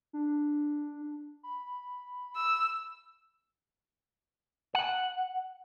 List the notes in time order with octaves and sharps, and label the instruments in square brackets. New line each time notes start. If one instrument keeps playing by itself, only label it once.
[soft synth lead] D4
B5
[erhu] E6
[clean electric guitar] F#5